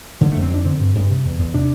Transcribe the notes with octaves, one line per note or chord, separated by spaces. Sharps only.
D3 F3
F2 A3
C4
F2 D4
D3 C4
G2
G2
C3
E2
E2
C3 D4